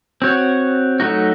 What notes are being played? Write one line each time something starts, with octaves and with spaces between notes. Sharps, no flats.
C4 F#4 C#5
F#3 A3 D#4 F#4